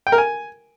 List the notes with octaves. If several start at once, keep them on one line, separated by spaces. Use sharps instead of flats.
G5
A#4
G#5